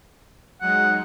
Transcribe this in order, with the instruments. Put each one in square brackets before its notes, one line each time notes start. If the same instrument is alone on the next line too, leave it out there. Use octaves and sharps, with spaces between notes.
[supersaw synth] F#3 G#3 D#4 [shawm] F#5